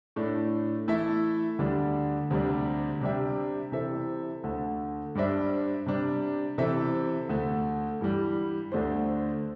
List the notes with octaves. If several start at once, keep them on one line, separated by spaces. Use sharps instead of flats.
A2 A3 D4
E3 A3 E4 A4 E5
D2 D3 G3 D4
D2 C3 G3 D4
C3 G3 D4 G4 E5
C3 E3 C4 A4 E5
D2 D3 A3
G2 G3 D4 C5 E5
C3 G3 D4
C3 E3 C4 A4 E5
D2 D3 A3
G2 E3 G3
D2 D3 A3 D4 C5